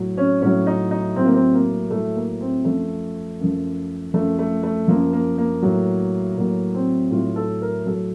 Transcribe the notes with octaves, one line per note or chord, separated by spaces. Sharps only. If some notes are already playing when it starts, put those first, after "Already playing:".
Already playing: A2 F#3
C#4
A2 F#3 C#4
D#4
D#4
A2 F#3 C4
A#3
C4
A#3
A2 F#3 A3
A#3
C4
F#2 F3 A3
F#2 F3
F#2 F3 A3
A3
A3
F#2 F3 A#3
A#3
A#3
A2 F#3
A2 F#3 A#3
C4
A2 F#3 F4
A4
A#4
A2 F#3 A4